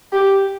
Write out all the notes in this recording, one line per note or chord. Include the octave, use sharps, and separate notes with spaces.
G4